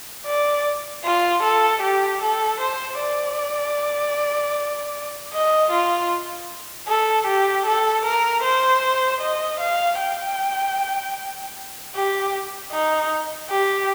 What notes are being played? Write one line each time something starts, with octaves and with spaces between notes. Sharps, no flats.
D5
F4
A4
G4
A4
C5
D5
D#5
F4
A4
G4
A4
A#4
C5
D#5
F5
G5
G4
D#4
G4